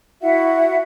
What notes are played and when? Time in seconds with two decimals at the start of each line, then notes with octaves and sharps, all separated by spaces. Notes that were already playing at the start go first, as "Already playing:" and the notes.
0.22 E4 F#4 E5 F#5